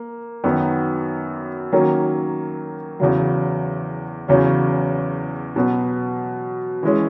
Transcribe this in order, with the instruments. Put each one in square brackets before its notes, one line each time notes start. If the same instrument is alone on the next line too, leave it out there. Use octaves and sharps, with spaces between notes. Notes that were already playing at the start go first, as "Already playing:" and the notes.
Already playing: [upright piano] A#3
F#2 D#3 F#3 B3
D#3 F#3 A#3 C#4
E2 C#3 F#3
E2 C#3 F#3 C#4
B2 F#3 B3
E3 G#3 C#4